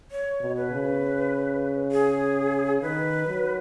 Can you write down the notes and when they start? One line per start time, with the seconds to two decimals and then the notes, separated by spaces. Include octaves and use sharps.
0.11 C#5
0.41 B2
0.56 B4
0.72 C#3
1.92 G#4
2.82 D#3 B4
3.27 F#3